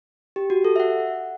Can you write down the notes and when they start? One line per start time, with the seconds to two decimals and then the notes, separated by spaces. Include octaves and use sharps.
0.36 G4
0.50 F#4
0.65 A4
0.76 E5
0.80 F#5